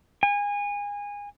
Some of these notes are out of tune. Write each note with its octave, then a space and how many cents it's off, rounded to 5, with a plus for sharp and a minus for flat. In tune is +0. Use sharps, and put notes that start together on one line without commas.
G#5 -25